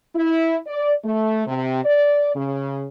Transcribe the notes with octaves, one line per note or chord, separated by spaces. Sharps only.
E4
D5
A3
C3
D5
C#3